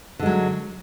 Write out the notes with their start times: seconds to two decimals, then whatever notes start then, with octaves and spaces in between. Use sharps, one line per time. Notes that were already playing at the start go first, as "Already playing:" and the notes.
0.19 D3
0.23 G#3
0.26 F#3